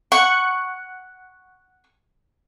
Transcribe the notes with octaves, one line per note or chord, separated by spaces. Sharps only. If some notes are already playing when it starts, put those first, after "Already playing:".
F#5 C#6